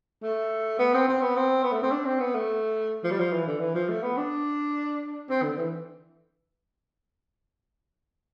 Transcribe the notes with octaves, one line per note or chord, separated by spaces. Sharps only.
A3
B3
C4
C4
B3
C4
B3
A3
C4
D4
C4
B3
A3
F3
G3
F3
E3
D3
E3
F3
A3
B3
D4
C4
D3
E3